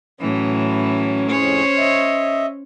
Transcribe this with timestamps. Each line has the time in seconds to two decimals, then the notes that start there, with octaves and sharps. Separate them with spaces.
0.21 A2 E3 F#3 C#4
1.30 F2 A2 G#4 C5 C#5
1.78 D#5 E5